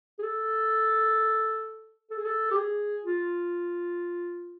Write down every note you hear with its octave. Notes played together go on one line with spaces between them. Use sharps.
G#4
A4
A4
G#4
A4
G4
G#4
F4